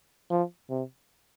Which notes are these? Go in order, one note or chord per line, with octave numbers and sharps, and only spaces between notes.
F3
C3